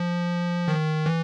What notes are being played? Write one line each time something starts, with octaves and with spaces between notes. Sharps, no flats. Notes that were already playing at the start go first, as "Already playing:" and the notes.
Already playing: F3
D#3
E3